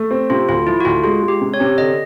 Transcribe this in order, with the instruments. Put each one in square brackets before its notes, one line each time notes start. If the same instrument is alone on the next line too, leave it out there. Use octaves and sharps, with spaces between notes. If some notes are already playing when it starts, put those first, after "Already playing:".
Already playing: [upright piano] A3
C4
[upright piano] C3 [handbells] F4
[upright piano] D2 [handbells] F4
[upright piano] F3 [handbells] E4
[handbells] F#4
[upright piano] D2 [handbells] F4
[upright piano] G#3 [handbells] F4
[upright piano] G#3
[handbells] G4
[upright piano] C3
[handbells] C#5
[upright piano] C3
[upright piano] D3 [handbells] D#5